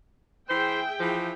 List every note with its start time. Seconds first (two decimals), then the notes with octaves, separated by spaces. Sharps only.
0.49 E3 G#4 C5 E5 G5
0.99 E3 F3